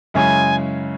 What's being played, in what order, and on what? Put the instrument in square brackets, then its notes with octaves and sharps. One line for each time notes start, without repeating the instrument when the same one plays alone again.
[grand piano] F#2 C#3 G#3 E4 C#5 [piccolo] G#5